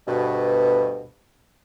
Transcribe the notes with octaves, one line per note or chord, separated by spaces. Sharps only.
D2 G2 B2